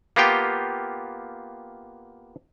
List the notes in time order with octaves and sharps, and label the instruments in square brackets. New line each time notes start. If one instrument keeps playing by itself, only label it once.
[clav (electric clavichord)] A#3 B3 F4 G4 G5